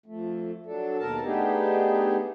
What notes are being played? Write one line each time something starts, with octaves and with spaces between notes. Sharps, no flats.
F2 A3
F#3 D4 A4
D#2 B2 A4 A#4 A5
A3 B3 D4 D#4 G4 G#4